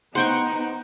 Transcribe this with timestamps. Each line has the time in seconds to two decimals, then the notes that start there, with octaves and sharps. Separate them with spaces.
0.15 B3 D#4 C5 F#5 G5 C#6